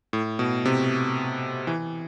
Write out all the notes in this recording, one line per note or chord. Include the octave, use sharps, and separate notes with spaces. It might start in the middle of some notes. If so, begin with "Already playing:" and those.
A2
B2
C3
E3